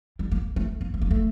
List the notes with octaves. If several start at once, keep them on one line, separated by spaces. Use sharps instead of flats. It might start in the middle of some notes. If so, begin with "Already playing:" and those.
G3
A#3
A3
A#3
A3
A#3
A3